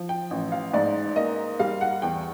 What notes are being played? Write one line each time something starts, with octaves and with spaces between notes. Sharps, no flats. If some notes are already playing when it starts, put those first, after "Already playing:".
Already playing: F3
G5
A1
F5
G#2 D5
A#3 D#5
G3 F5
F#5
E2 G5